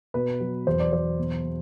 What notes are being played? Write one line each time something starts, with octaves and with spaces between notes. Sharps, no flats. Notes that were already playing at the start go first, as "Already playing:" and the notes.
B2 B4
F#3
E2 C5
D5
F#3 C5
B2
B2